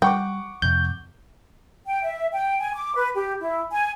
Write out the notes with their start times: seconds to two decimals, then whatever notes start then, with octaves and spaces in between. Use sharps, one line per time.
0.02 G3 F#5 G5 C#6 D6
0.62 F2 C3 G6
1.86 G5
2.02 E5
2.33 G5
2.59 G#5
2.76 D6
2.95 B4
3.15 G4
3.40 E4
3.71 G#5